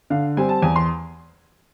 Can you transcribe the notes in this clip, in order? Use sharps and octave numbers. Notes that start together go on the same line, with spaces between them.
D3 F5
G3 C4 G#5
A5
E2 G#5
C6